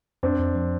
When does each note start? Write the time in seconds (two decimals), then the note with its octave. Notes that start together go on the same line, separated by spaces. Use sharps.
0.23 F2 C4 D4
0.39 F2
0.55 F3